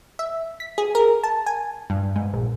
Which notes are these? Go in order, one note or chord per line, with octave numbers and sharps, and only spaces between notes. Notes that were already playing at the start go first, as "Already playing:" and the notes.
E5
B6
G#4
A#4
A5
G#5
G2
G#2
A#1